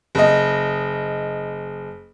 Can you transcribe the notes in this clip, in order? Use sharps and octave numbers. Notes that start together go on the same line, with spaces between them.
F#1 D#5